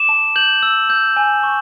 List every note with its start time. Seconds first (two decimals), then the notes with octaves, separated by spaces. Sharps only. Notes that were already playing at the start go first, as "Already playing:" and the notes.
Already playing: D6 E7
0.09 A5
0.36 G6 F#7
0.63 E6
0.90 G6
1.17 G#5
1.43 C#6